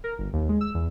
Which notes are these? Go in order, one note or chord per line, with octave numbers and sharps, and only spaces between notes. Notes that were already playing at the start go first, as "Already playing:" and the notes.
A#4
G1
D#2
G#3
E6
E2